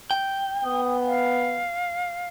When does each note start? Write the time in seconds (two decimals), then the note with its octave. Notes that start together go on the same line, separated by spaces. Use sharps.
0.11 G5
0.65 B3 D#6
1.06 F5